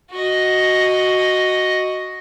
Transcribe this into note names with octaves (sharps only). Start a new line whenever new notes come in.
F#4 D#5